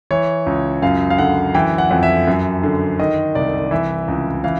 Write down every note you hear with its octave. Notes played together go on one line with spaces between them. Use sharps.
E3 C#5
C#2
F#2 F5
F5
D3 F#5
E3 G5
F#5
F2
E5
F#2
D3
D#3 D#5
C2 D5
E3 E5
C#2
E3 F5